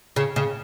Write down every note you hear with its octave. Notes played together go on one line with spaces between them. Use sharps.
C#3
C#3